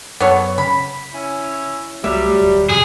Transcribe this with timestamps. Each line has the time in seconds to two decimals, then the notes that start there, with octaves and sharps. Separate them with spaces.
0.20 F#2 B3 A4 C#5
0.58 C#3 B5
1.14 C#4 E4
2.04 C2 F#3 G3 A3 E5
2.41 D#1
2.70 F2 C3 G#4